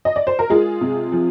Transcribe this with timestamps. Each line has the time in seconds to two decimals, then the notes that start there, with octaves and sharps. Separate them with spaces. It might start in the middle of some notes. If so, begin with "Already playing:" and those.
0.05 D#5
0.16 D5
0.27 C5
0.39 A#4
0.50 G#3 F4 G#4
0.81 C3
1.12 F3